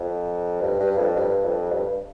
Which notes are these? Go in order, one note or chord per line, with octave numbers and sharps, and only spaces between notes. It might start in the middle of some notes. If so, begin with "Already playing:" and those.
Already playing: F2
G2
G2
F2
G2
F2
G2